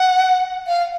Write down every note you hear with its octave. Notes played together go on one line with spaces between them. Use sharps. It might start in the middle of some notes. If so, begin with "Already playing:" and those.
Already playing: F#5
F5